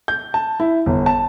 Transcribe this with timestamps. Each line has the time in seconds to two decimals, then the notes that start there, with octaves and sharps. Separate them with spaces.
0.08 G6
0.34 A5
0.60 E4
0.86 G1
1.06 A5